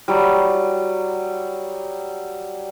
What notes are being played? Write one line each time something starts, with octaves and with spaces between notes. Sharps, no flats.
F#3 G3